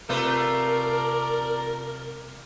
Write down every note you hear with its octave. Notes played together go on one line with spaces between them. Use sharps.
C3 A3 F4 A#4 B4 D5 A#5